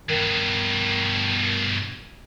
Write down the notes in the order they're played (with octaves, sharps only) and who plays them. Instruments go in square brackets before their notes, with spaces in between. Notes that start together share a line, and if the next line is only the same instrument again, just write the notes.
[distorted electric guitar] G2 B2 [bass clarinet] D#3